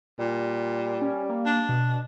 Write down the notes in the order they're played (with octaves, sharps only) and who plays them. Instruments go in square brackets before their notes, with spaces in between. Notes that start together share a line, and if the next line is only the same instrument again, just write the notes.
[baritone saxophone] A#2 [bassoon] G3
[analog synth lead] C#4
A#3
[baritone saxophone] D4
[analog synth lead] B2